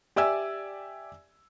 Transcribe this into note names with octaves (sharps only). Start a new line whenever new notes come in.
G4 D5 E5 G#5 E6